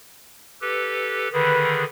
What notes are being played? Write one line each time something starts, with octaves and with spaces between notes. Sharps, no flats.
G4 A4 B4
D3 D#3 G#4 B4